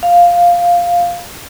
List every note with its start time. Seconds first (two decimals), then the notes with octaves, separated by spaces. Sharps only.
0.03 F5